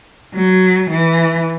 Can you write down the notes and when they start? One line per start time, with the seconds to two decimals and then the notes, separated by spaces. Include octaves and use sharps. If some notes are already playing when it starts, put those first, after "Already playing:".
0.35 F#3
0.90 E3